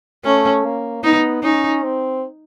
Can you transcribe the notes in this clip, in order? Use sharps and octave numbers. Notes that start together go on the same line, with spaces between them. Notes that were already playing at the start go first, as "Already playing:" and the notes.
A3 C#4
A#3
B3 D#4
C#4 D#4
C4